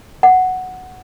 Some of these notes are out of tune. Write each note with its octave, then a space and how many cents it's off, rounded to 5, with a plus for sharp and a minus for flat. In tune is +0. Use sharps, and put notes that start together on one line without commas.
F#5 +0